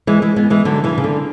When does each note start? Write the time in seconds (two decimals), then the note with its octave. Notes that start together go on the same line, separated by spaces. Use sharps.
0.07 E3 G#3
0.22 E3 G#3
0.36 G#3 B3
0.50 E3 G#3
0.65 D3 F#3
0.84 C#3 E3
0.98 C#3
1.04 D3